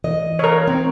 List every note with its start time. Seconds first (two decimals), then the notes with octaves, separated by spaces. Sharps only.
0.04 E3 D#5
0.39 A#4 C#5
0.67 C4